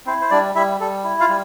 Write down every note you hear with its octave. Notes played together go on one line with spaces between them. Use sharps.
C4 E4 C5
C5
G3 D4 D5
G3 E4 E5
G3 A4
E4
F4 F5
G3